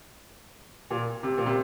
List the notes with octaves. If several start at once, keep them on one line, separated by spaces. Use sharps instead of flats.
A#2
C3
A#2
C3